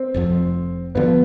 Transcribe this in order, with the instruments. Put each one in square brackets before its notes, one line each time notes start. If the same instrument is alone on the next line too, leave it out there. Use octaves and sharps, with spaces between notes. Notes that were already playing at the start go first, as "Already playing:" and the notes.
Already playing: [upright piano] C4
[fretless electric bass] F1 F2 C3 F3
[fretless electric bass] G2 D3 F3 [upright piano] B3